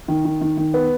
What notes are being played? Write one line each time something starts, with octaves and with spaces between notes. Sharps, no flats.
D#3
D#3
D#3
D#3
B3